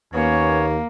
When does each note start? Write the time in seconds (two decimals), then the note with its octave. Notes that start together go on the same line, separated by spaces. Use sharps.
0.14 D#2 A#3 B3 C#4 C#5